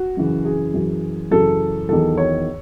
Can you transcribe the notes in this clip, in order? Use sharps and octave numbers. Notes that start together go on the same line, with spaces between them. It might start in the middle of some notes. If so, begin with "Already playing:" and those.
Already playing: F#4
F#2 C#3 E3
G#4
F#2 E3
F#2 C#3 E3 A4
E2 D#3 F#3 A4
C#5